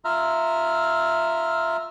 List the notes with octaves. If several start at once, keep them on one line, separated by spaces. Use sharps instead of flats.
F4 E5 A#5 F6